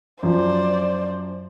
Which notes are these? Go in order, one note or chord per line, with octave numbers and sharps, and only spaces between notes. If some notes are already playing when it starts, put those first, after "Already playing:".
F#2 F3 C5 D5